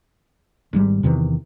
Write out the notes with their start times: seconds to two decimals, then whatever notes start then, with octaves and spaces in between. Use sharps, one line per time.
0.73 G#1 G#2 G3
1.03 E2 C3 D#3 E3